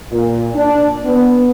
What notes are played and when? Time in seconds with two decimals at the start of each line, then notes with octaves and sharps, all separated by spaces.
0.11 A#2
0.55 D4
1.05 B3